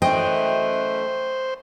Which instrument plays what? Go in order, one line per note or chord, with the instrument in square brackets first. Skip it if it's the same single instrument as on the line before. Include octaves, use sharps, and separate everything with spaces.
[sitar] F#2 E3 D#5 [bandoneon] A3 [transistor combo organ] C5 [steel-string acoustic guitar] G5